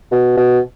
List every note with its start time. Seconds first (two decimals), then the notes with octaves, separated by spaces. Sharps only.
0.12 B2
0.37 B2